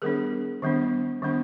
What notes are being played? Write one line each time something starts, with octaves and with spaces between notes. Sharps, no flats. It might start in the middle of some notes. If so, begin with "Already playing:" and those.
D#3 G3 B3 D4 G#4 A#4
D#3 G3 B3 D4
D#3 G3 B3 D4